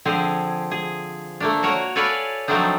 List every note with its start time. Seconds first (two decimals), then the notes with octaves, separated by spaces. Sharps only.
0.05 D3 F3 C4 G#4
0.71 G#4
1.40 A3 A#3 D4
1.63 F#4 A#4 C#5
1.95 A4 B4 C#5 D5 F5 G#5
2.48 F3 F#3 A3 C4 D4 D#4